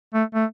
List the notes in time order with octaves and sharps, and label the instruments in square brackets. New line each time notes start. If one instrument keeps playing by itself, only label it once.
[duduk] A3
A3